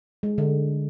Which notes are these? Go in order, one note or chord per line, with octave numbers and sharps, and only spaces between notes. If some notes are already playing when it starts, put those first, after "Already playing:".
G#3
D3